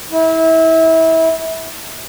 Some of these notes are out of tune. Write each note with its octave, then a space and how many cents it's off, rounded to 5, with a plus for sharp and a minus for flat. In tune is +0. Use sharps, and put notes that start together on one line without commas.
E4 -25